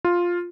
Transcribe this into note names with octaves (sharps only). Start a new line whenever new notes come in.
F4